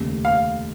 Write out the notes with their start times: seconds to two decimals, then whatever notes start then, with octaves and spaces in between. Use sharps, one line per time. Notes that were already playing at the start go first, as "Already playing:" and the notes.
Already playing: F1 D#2 C#3
0.25 F5